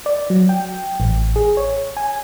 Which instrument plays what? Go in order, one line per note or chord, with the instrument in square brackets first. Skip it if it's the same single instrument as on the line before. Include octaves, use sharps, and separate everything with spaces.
[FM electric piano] D5
F#3
G5
A1
G#4
C#5
G#5